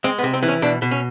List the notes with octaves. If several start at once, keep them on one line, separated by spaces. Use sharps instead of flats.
G#3 C4
B3
C3
C4
E3
C#4
B2 D4
B2
C#4